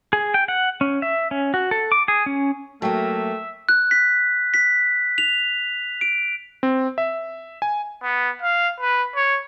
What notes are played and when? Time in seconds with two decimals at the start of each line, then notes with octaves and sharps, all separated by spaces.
0.13 G#4
0.34 G5
0.48 F#5
0.81 C#4
1.02 E5
1.31 C#4
1.54 F#4
1.71 A4
1.92 D6
2.08 G#4
2.26 C#4
2.82 F#3 A3 A#3 E5 G5 A5
3.69 F#6
3.91 B6
4.54 B6
5.18 F7
6.01 D7
6.63 C4
6.98 E5
7.62 G#5
8.03 B3
8.42 F5
8.81 B4
9.16 C#5